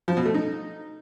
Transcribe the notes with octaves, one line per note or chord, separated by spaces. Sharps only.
F3
B2
A3
D#4